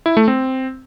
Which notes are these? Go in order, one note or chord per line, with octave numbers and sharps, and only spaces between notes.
E4
A3
C4